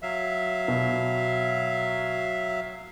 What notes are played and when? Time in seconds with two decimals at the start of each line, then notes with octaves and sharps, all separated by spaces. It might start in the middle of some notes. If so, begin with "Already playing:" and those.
0.02 F#3 E5 F5
0.68 B2